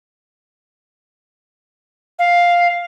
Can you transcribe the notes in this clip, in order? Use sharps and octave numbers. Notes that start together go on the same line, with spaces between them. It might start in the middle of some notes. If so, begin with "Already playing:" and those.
F5